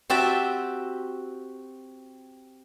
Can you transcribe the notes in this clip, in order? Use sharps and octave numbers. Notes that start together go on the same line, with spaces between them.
C4 F#4 G4 E5 G5 A5